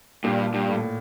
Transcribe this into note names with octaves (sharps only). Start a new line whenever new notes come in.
G2 A#2
G2
A2